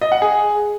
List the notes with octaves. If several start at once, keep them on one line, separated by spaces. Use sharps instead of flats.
D#5
F#5
G#4